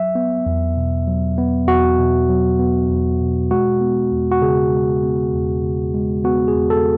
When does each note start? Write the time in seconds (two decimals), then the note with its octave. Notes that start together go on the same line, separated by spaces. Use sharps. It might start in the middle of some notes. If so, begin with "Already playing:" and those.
Already playing: F#3 E5
0.15 B3
0.46 E2
0.76 B2
1.07 F#3
1.38 B3
1.67 E2 F#4
1.98 B2
2.29 F#3
2.59 B3
2.90 E2
3.20 B2
3.51 G#3 F#4
3.81 B3
4.12 E2
4.32 F#4
4.41 C#3 G#4
4.73 G#3
5.03 B3
5.34 E2
5.64 C#3
5.94 G#3
6.24 B3 F#4
6.48 G#4
6.55 E2
6.70 A4